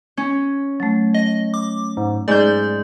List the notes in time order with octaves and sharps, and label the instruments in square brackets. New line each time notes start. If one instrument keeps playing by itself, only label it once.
[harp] C#4
[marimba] F#3 A3
[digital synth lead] D#5
D6
G#2
[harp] G#2 G6 [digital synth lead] D5